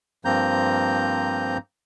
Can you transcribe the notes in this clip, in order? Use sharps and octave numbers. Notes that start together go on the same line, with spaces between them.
G2 F3 A#3 C4 A#5 G6